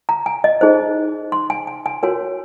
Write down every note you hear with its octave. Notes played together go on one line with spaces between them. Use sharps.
A#5
G#5
D#5
D#4 G#4 C5
C6
G#5
G#5
G#5
F#4 A#4 C#5 G#5